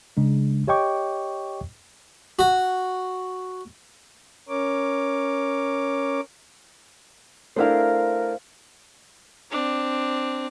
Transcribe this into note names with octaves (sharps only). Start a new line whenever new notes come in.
C#3 G#3 D4
G4 C#5 D#5 G5 C#6 D6
F#4
C#4 A#4 C#5 D6
A3 D4 E4 A#4 C5 E5 F5
C4 D4